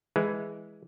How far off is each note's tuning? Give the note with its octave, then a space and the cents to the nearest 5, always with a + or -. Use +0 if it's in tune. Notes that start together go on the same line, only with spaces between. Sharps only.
E3 +0 G#3 +0